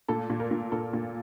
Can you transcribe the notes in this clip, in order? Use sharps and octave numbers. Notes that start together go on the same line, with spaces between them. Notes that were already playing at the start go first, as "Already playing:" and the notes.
A#2 A4
A#2
A#4
A#2
A#2 A4
A#2